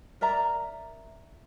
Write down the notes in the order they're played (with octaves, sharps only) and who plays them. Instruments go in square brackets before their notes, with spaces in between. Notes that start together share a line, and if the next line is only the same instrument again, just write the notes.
[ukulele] A#4 D5 E5 A#5